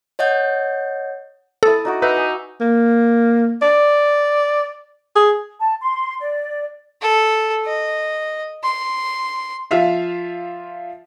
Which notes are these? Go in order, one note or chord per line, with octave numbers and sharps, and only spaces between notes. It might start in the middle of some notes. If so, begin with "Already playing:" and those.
C#5 D#5 F#5 G6
E4 A4 D#6
D#4 F#4 D6
D#4 B4 E5
G#5 D#6
A#3
D5
G#4
A5
C6
D5
A4
D#5
C6
F3 F4 E5 F5